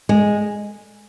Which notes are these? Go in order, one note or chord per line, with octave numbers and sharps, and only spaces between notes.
G#3